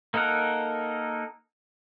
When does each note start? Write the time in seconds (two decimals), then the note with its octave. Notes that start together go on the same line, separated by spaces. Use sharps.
0.14 A#3 D#4 A4 A#4 F#5